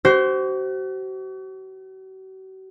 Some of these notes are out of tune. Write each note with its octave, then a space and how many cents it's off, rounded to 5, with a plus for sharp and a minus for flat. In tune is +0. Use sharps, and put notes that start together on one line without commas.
F#4 +45 C5 +0